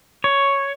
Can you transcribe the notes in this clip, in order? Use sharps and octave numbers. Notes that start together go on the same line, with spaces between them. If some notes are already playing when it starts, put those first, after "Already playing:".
C#5